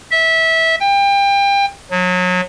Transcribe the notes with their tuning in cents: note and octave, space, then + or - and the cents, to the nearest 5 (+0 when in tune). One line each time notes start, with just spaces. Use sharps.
E5 -20
G5 +30
F#3 -30